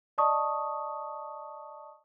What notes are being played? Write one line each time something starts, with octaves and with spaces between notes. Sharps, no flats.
D5 D#5 A5 C#6 D#6